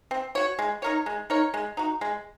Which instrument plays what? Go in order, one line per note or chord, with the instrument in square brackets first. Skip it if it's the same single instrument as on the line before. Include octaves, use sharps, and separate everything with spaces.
[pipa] C4
F#4 C#5
G#3
D#4 A#4 C#5
G#3
D#4 A#4 C#5
G#3
D#4 F#4
G#3